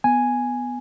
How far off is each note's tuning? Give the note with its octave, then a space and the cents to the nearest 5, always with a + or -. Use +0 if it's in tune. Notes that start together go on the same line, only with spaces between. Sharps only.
B3 +5 G#5 +0